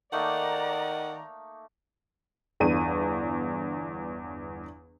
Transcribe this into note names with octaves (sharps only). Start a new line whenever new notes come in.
D#3 A3 A#3 D#4 D5 F#5 A#5
G1 E2 D4 D#7